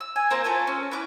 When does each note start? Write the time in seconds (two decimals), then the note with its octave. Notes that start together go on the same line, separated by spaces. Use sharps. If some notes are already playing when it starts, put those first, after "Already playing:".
0.01 E6
0.16 G#5
0.30 A#3 C4 A#4 C5
0.44 A3 F4 A4 G#5
0.67 C#4
0.91 B3 E4 B4 D6